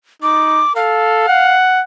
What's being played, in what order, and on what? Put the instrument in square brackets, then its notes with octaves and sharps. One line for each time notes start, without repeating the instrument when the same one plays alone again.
[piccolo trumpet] D#4 [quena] D6
[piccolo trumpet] A4 [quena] F5
[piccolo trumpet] F#5